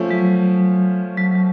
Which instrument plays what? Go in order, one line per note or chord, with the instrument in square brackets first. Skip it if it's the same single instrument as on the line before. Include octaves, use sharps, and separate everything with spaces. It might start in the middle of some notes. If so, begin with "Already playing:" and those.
Already playing: [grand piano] F3 A3 C#4
[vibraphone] F#3
F#3
F#3